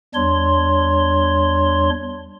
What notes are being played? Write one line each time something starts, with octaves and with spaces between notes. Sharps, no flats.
E2 G3 D4 C#5 C6